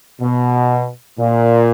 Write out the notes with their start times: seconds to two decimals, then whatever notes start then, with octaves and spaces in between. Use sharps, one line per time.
0.20 B2
1.18 A#2